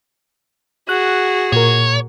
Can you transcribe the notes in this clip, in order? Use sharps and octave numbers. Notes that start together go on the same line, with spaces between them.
F#4 G#4 F#6
A#2 A#4 C#5